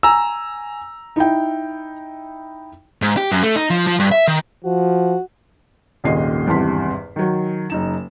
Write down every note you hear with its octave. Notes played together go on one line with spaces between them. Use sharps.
G#5 A#5 E6
D#4 E4 G5
G#2
G4
F#2
A3
D#4
F3
F3
G2
E5
D#3
F3 F#4
D#1 G#1 A#2 C#3 D#5 C7
G#1 E2 G2 C3 C6 B6
D#3 F#3
F#1 D#4 E7